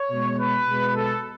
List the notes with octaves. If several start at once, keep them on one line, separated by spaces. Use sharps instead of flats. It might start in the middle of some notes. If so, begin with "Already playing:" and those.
Already playing: C#5
B2 G#3
B4
B2 G#3
A4